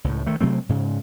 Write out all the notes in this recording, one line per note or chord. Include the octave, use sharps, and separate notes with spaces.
C#2 A2
D#3 A3
C3 F#3 A3 C4
G#2 C#3